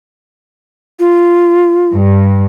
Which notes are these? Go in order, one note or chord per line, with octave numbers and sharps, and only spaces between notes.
F4
G2